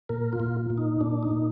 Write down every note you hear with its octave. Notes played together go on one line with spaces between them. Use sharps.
A#2 A#4
F4
A#2
A#2
D#4
A#2 D4
D#4
A#2